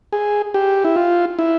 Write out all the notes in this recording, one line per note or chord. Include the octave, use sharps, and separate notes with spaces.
G#4
G4
E4
F4
E4